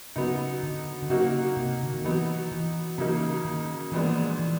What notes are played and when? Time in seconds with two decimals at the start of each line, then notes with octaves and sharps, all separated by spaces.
0.16 C#3 F#3 B3 D#4
0.63 D3
1.02 D3
1.10 C#3 F#3 A#3 D#4 F#4
1.57 C3
1.83 D3
1.94 D#3
2.04 E3 F#3 B3 D#4
2.52 E3
2.98 C#3 E3 F#3 A#3 D#4
3.45 D#3
3.92 A#2 E3 F3 G#3 B3 D4
4.39 E3